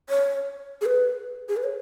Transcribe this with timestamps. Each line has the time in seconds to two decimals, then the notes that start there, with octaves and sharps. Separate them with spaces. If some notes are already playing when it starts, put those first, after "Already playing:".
0.10 C#5
0.81 G#4
0.86 B4
1.49 G#4
1.57 B4
1.64 C#5